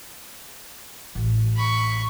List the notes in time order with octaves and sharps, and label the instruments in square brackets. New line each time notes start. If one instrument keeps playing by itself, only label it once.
[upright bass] A1
[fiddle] B5 C#6